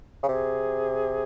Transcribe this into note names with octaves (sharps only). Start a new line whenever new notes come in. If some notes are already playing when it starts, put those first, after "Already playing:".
C#3
C3 G#4